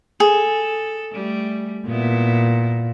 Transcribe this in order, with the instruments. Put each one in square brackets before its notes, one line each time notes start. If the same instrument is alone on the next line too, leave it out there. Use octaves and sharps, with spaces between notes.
[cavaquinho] G#4 [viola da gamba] A4
[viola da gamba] G3 A3
[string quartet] A#2 [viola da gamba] B3 E4